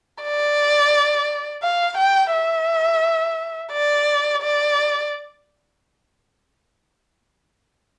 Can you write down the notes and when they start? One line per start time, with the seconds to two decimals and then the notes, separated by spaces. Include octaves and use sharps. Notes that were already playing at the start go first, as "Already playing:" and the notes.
0.23 D5
1.63 F5
1.98 G5
2.33 E5
3.73 D5
4.42 D5